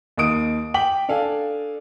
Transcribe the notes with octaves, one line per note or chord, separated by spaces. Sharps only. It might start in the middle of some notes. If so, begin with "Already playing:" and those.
D#2 A#3 D#4 D#6 D7
G5 D6 B6 F#7
D4 A4 F5 G#5